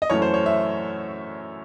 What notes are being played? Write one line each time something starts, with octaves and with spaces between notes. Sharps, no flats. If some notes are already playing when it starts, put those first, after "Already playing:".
D#5
F#2 E3 A3 C#5
C5
C#5
E5